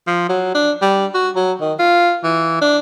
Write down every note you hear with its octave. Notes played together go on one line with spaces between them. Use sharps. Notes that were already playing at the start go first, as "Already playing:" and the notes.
F3
F#3
D4
G3
F#4
F#3
D#3
F4
E3
D4